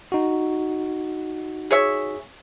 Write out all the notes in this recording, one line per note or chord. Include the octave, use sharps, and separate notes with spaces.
D#4 F#4
G#4 C#5 E5